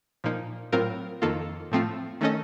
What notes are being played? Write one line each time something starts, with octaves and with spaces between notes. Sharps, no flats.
A#2 F3 A#3 D#4
A2 F#3 C4 F4 A#4
F2 D#3 A#3 F4 A4
A2 F3 A3 C4 F4
D#3 A3 C#4 A4 D#5